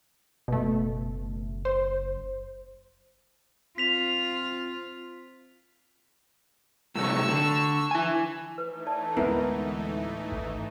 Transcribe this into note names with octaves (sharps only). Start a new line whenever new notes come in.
F#1 B2 A3
C5
C4 F4 B6 F7
A2 C3 F#3 C#6 E6
D3
E4 G#5
E3 A3 D#4 B4
C#5 D5 A5
D1 G#3 B3 C4 E4 A#4
G#1